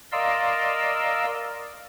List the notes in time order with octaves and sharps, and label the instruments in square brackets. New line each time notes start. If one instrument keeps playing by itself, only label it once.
[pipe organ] A#4 D5 D#5 F5 C6 E6